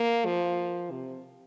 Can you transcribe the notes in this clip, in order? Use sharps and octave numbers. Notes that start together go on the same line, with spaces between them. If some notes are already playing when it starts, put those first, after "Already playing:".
Already playing: A#3
F3
C3